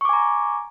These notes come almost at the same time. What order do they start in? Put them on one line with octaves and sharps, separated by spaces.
C#6 D6 G#5 A#5